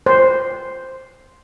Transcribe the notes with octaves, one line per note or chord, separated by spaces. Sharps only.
C5